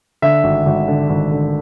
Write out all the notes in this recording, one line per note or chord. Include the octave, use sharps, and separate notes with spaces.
D3 E5
G#1
G#1
D3
G#1
D3